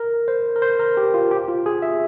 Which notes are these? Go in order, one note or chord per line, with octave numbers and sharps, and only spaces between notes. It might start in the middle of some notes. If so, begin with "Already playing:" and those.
Already playing: A#4
C5
A#4
C5
A#4
G4
F4
G4
F4
G#4
E5